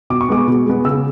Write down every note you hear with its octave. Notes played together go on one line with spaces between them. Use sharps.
B2 D6
C#6
G#3 B3 D6
B2
G#3 B3
C#3 E6